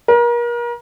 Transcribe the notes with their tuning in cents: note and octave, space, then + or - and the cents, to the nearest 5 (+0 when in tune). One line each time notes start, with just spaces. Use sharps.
A#4 +35